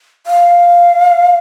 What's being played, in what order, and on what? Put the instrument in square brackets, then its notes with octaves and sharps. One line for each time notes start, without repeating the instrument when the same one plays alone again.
[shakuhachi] F5